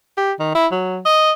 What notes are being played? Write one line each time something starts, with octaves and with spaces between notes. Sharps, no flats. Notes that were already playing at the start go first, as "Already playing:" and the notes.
G4
D#3
E4
F#3
D#5